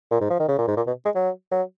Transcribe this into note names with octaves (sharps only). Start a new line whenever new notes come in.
A#2
G#2
F3
D#3
C#3
A#2
G#2
A#2
B2
G#3
F#3
F#3